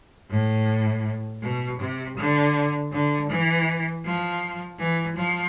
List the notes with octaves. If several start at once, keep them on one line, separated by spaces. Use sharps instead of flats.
A2
B2
C3
D3
D3
E3
F3
E3
F3